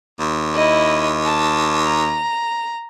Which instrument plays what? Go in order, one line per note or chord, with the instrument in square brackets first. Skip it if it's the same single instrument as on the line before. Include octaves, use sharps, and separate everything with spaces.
[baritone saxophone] D#2
[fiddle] E4 D#5
A5
A#5